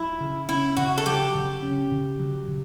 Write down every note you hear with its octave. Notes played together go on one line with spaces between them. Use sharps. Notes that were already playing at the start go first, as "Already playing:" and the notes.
Already playing: F#3 E4
C#3
C#4 E4
C#3 F#4
A4
F#3 G4
C#3
C#4
C#3
F#3
C#3